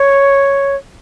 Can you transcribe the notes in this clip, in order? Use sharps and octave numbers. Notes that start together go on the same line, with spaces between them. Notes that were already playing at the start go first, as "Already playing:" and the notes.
Already playing: C#5